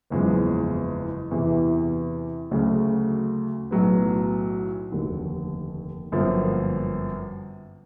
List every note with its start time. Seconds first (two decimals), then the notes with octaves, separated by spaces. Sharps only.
0.10 F#1 E2 C#3 F3 G#3
1.31 E2 C3 E3
2.51 D2 C#3 F#3 A3
3.71 B1 A2 F#3 B3
4.92 F1 D#2 D3
6.12 G1 F#2 D3 F3 A#3